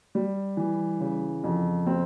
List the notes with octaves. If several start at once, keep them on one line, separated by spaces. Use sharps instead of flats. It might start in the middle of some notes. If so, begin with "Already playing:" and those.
G3
E3
C#3
F2
C4